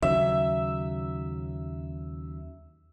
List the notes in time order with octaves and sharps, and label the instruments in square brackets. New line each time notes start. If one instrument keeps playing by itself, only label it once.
[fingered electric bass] D#2 C#3 F#3 [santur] E5